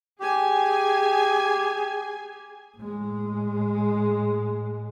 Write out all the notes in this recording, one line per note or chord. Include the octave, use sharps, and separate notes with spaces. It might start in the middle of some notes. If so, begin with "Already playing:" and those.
G4 G#4 G#5
A2 G#3